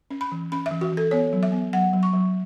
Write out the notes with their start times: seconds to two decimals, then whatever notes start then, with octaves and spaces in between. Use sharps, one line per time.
0.11 C#4
0.21 B5
0.32 E3
0.52 C#4 B5
0.66 E5
0.71 E3
0.81 F#4
0.92 E3 A4
1.11 B3 C#5
1.33 F#3
1.43 E5
1.52 B3
1.73 F#3 F#5
1.93 F#3
2.03 C#6
2.13 F#3